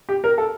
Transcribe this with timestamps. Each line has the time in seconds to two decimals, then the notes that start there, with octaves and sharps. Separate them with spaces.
0.09 G4
0.24 A#4
0.38 A4